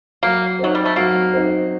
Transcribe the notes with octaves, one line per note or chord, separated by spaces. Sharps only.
F#3 A#3
F#3 C4 D#4
G3
A3
F#3 A#3
C4 D#4